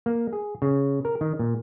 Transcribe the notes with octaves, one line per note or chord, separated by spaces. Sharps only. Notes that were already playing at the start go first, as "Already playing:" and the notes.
A#3
G#4
C#3
A#4
D#3
A#2